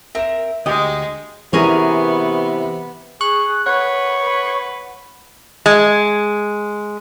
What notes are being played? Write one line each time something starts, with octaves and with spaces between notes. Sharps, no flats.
C4 A#4 E5 E7
D2 G#3 G4 D#5 G5 D#6 G6
C3 E3 B3 C#4 G#4 A#4
G#4 C#6 F#6
B4 C#5 F#5
B4
G#3